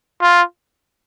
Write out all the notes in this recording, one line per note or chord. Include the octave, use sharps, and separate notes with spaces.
F4